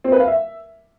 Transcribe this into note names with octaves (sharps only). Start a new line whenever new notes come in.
C4
B4
F5
E5